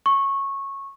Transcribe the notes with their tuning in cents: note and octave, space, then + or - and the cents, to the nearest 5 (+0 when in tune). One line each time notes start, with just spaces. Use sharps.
C#6 -15